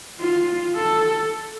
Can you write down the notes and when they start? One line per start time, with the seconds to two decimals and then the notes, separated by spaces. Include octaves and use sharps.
0.20 F4
0.76 A4